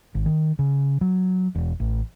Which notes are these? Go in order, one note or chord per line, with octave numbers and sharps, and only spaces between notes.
G#1
D#3
C#3
F#3
E1
A1